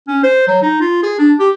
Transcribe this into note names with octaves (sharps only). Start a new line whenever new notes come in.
C#4
C5
F#3
D#4
F4
G#4
D4
G4